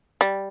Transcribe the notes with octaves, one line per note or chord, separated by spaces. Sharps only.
G3